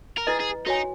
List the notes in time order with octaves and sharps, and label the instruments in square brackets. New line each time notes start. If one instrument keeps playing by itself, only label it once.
[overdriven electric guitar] A#4
[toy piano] E4 B4 D#5 [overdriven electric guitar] G#4
[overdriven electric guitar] G#4
[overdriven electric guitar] D#4 [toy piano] F#4 C#5 G#5